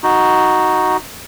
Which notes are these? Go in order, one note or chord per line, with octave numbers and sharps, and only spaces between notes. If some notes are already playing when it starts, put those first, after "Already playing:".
D#4 F#4